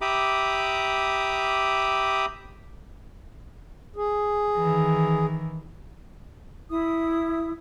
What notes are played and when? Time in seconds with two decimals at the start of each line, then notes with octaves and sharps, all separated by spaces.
0.01 G4 E5 A#5 B5 D6 D#6
3.96 G#4
4.57 D#3 E3
6.69 E4 D#6